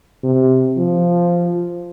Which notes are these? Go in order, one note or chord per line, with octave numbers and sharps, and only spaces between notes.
C3
F3